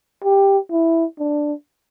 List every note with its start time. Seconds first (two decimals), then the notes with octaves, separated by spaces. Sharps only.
0.24 G4
0.71 E4
1.19 D4